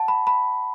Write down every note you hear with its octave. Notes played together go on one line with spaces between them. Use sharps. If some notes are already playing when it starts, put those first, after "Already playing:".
Already playing: F#5 A5
B5
B5